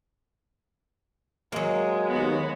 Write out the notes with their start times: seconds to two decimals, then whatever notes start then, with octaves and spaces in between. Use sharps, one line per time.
1.52 F#3 G#3 A#3
2.07 D#2 B3 F#4